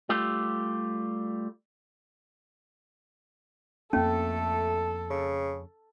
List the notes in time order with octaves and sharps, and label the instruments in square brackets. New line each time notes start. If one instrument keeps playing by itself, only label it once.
[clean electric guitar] G3 A3 F4 G4
[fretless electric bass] F2 A#3 [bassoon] A3 [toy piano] C#4 [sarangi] A4
[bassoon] C#3